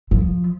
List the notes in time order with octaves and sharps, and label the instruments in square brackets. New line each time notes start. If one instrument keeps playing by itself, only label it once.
[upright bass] F3